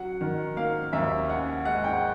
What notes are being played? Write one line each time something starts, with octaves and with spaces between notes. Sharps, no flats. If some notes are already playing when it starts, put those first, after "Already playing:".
Already playing: F#3 F#5
D#3
A#3 F5
D#2 E5
C#4 F#5
G#3 F#5
G5